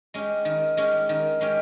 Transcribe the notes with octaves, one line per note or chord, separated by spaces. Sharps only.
G#3 C#4 G4
D#3
G#3 C#4 G4
D#3
G#3 C#4 G4